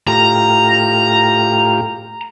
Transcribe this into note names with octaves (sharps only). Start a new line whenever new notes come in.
A2 F4 G4 A#5